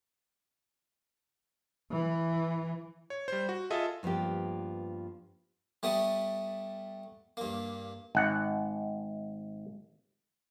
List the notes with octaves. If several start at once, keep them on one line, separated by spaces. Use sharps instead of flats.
E3
C#5
G3 C5
F#4
F4 G#4 A4 D#5 E5
G2 F3 A#3 B3 G4
G3 A3 B3 D#6
G2 A#3
G#1 F#5